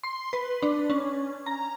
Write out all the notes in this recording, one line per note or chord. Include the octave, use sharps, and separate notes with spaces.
C6
B4
D4
C#4
A#5